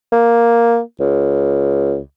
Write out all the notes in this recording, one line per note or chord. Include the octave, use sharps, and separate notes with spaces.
A#3
C#2